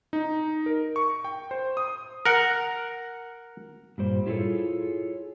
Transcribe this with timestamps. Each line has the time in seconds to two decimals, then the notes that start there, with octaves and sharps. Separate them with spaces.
0.13 D#4
0.66 A#4
0.96 C#6
1.25 G5
1.51 C5
1.77 D#6
2.26 A#4 F#5
3.98 G2 A#2 G3 C5
4.26 E4 F4 G#4 A4 C#5